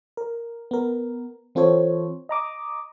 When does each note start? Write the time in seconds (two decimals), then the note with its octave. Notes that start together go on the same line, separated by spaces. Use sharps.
0.17 A#4
0.71 B3 A#4
1.55 E3 C4 F4 A4 C5 C#5
2.29 D#5 A#5 D6 D#6